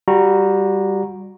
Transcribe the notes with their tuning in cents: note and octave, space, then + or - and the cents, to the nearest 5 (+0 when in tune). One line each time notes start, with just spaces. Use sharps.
G3 +0 F#4 -20 A#5 +0